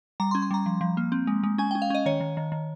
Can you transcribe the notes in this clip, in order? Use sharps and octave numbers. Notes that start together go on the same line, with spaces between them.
G3 A#5
C6
C#4
C6
G3 A#5
F3
F3
A#3
C4
G#3
G#3
C#4 G#5
G5
C#4
F5
C#4 D#5
D#3 C#5
D#3
D#3
D#3